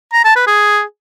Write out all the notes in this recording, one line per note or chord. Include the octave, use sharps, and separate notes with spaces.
A#5
A5
B4
G#4